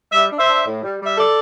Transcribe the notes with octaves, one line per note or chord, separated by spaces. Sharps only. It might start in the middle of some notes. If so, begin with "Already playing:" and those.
G3 E5
D4
C5 E5
D4
A2
G3
G3 E5
A4 D5